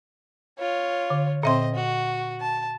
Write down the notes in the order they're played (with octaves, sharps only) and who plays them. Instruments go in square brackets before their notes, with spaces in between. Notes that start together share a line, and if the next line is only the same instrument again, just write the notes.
[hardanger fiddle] F4 C#5
[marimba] D3
[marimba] A#2 E5 C6 [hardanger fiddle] C4 D#5
[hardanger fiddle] F#4
A5